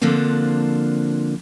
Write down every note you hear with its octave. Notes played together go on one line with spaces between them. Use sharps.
D3 F3 A#3 C4 D4